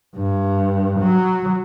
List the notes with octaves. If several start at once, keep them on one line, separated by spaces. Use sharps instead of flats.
G2
F#3